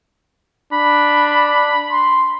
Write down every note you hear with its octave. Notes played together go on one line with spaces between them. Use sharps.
D4 B5
C6